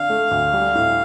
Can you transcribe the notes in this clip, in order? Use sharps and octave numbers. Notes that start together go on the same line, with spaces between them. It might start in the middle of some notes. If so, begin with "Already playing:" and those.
Already playing: D3 D4 F5
A3
D2
G3
A2